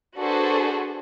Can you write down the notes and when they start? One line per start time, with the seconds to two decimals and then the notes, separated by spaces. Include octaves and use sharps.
0.18 D4 F#4 G#4 A4 B4 C5